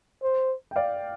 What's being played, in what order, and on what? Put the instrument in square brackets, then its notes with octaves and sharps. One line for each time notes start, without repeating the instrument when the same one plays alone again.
[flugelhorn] C5
[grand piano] G5
D5 F5